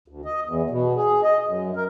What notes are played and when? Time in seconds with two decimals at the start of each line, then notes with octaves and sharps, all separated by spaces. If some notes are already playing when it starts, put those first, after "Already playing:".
0.08 D2
0.25 D#5
0.45 E2
0.70 B2
0.96 G#4
1.23 D#5
1.45 F#2
1.76 A#4